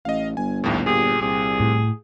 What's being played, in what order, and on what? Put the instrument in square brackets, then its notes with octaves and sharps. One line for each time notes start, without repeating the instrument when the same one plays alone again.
[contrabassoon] A1 [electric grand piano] D#5 F5
[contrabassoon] G1 [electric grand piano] G#5
[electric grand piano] A#1 D#2 A2
[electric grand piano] A#2 G4 [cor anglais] G#4
[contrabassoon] C2 [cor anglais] G#4
[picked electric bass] A2